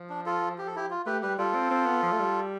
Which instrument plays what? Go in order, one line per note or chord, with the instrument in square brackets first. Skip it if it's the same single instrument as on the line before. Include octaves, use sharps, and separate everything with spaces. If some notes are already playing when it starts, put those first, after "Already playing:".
Already playing: [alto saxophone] F3
[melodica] D4
F4 A4
G4
A4
E4 G4
F4
[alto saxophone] A3 [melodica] G4 B4
[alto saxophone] G3 [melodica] G4 B4
[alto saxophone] G3 [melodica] F4 A4
[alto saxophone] C4
C4
B3
F3
A3
G3